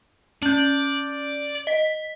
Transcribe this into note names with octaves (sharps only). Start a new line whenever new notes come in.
C#4 D5 G6
D#5 B6